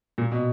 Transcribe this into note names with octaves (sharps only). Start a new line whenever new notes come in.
A#2
B2